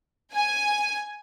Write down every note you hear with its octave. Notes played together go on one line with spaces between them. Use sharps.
G#5